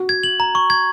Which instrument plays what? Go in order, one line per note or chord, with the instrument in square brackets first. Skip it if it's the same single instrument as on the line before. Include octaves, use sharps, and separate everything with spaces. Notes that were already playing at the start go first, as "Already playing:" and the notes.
Already playing: [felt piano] F#4
[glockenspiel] G#6
F#7
A#5
C#6
G#6